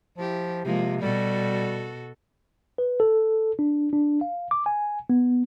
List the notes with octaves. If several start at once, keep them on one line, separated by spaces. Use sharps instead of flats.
F3 E4 G4
C3 F3 G#3 A#3
B2 G3 F#4 A4
B4
A4
D4
D4
F5
D6
G#5
B3